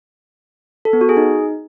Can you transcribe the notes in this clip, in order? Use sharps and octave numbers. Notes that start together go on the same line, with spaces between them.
A4
B3
F#4
G#4
D#4